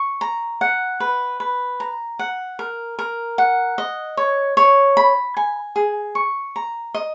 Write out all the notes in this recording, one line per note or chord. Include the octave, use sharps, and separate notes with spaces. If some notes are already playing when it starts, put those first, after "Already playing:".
Already playing: C#6
A#5
F#5
B4
B4
A#5
F#5
A#4
A#4
F#5
D#5
C#5
C#5
B5
G#5
G#4
C#6
A#5
D#5